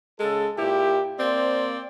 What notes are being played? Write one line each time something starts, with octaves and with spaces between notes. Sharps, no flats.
C#3 G#3 A4
A#2 E4 G4
A#3 C4 C5 D5